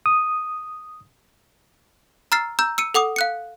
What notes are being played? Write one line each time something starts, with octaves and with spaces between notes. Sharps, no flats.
D#6
A#5 E6 F6 A6 C7
A#5 E6 G6
E6 C#7 D#7
A4 F#5 D6 D#6
F5 F#6 C#7